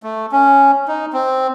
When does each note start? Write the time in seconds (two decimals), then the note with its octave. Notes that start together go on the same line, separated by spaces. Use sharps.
0.03 A3
0.32 C#4
0.88 D#4
1.13 C4